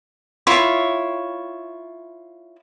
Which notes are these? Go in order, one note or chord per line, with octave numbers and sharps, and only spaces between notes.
E4 F4 C#5